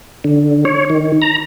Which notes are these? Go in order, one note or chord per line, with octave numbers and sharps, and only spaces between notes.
D3
C#5
D#3
A#5